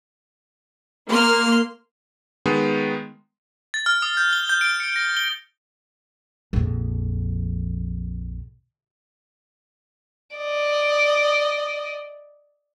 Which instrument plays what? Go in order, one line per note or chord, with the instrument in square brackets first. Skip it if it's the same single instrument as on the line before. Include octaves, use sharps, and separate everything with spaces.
[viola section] A#3 [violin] C6 F6
[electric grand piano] D#3 G#3 B3
[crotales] A6
F6
D#6
G6
G7
G6
D7
C#7
A#6
G7
[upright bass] A#1 F2
[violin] D5 D#5